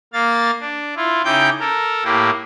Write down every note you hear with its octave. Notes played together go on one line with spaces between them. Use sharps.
A#3 F5 A6
D4
E4 F4
C#3 D#4 E4 G5 D6 G6
A4 A#4
A2 A#3 E4 G4